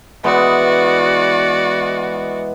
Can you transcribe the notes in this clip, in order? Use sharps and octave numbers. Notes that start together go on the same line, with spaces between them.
E3 G#3 B3 F#4 D5